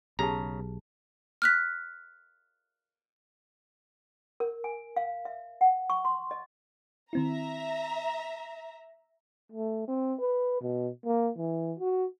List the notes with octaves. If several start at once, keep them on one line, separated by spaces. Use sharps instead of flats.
B1 C#3 G4 G#4 A5 A#5
F6 F#6 B6
A#4
G#5
F5
E5
F#5
C#6
C6
D#5
D#3 C4 E4 E5 A#5
A3
C4
B4
B2
A#3
E3
F#4